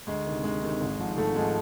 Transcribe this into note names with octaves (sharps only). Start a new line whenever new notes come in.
D2 G#3
C3 D#3
D2 G#3
C3 D#3
G#1
G#2 F3
G#1 A3
G#2 F3 G#3